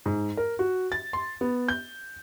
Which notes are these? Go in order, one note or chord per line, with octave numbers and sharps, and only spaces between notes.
G#2
A#4
F#4
A6
C6
B3
G6